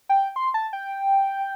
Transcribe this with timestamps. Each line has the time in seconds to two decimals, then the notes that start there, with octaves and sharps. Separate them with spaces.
0.09 G5
0.36 C6
0.54 A5
0.73 G5